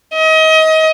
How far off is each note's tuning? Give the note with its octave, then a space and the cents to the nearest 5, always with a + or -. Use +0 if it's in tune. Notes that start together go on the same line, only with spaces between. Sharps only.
D#5 +30